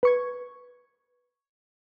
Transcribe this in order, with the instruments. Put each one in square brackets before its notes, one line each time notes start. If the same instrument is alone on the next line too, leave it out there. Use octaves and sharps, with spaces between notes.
[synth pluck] B4 C#6 G#6